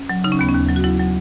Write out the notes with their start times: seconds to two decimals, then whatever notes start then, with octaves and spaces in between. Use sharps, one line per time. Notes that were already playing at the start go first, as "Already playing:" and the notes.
Already playing: C#4
0.10 F#3
0.24 C#3 D#4
0.32 C#4
0.39 D#2 B3
0.49 C#4
0.54 D#2
0.69 F#3
0.76 F#4
0.84 F#3 E4
0.99 F#3